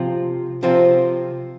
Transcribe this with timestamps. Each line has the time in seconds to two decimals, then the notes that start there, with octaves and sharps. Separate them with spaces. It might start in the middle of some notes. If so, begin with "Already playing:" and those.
Already playing: C3 F3 C4 F4
0.63 C3 F3 C4 F4